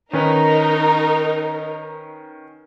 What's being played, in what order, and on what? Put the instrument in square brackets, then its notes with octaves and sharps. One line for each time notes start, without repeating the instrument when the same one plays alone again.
[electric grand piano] D#3 C#4 B4 [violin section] D#4 A#4